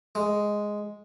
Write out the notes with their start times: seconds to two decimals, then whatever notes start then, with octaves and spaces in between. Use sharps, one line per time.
0.15 G#3